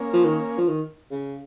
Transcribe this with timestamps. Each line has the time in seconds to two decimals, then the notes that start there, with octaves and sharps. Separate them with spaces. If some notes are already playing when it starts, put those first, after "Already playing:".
Already playing: A#3 C#4
0.13 F3
0.24 D#3
0.58 F3
0.68 D#3
1.11 C#3